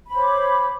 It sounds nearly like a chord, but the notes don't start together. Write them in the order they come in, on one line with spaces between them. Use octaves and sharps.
B5 C5 C#5 D6